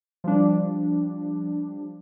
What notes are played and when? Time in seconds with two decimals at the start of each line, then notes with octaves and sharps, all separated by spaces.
0.24 F3 G3 D4